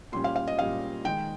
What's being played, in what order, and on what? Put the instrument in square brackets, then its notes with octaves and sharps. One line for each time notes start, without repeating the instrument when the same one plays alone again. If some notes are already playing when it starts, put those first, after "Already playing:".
[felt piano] A#2 G3 C#4 C6
F5
F5
D#5
A#2 G3 C#4 F5
D#3 G#3 D#4 G5